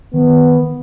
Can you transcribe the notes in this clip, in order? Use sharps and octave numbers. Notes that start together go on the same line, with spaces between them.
D#3 B3